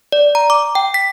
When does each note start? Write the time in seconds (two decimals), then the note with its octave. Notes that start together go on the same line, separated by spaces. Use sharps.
0.12 D5
0.35 A#5
0.50 D6
0.75 G5
0.94 B6